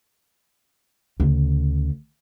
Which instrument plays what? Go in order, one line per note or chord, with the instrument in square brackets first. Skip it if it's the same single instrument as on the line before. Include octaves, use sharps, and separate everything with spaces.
[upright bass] D2 C#3